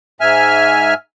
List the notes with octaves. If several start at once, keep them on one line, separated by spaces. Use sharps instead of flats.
G#2 E5 G#5 F6